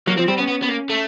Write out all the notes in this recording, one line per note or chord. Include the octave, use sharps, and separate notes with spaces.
F#3 A#3
F3 C4
G3 C4
B3 C#4
B3
B3
A#3
A3